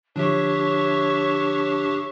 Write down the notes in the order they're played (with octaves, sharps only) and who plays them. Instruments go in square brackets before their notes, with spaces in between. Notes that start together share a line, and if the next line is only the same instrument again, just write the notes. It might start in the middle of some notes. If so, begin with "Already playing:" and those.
[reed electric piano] D3 F3 [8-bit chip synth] D4 G4 [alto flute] C#5 [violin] E5 C#6